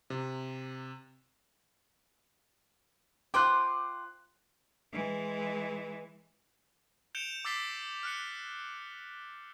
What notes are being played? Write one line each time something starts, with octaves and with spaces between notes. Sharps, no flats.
C3
F4 C5 G5 D6 F#6
E3 G#3
G6 C#7 D7 E7 F7 G7
D6 E6 A6 B6 C7 G7
F6 F#6 C#7